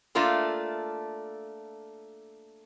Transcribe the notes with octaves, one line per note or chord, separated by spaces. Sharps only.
A3 A#3 D4 F4 A4